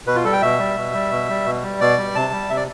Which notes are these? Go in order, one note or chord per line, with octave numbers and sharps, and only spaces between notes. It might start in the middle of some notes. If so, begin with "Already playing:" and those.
B2 B4
F4
G3 A4
G5
B2 E5
G3
B2
G3
B2
G3
B2
G3
B2 D5
G3
C3 A5
G3
C3 E5
D5